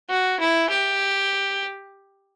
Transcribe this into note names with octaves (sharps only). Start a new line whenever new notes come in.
F#4
E4
G4